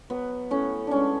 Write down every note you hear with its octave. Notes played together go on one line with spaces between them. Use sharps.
F#3 B3
A2 C#4
G#3 C#4 D4